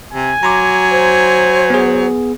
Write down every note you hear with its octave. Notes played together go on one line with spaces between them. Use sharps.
C3 G#5
F#3 A#5 C6 D6
C5
B3 G#4